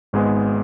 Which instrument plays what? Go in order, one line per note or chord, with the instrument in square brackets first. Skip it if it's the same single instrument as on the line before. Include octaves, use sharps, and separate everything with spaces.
[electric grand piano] G#1 G#2 G#3 B3